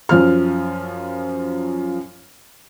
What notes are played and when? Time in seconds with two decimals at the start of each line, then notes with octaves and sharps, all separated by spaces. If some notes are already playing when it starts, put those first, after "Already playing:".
0.09 F#2 F3 F6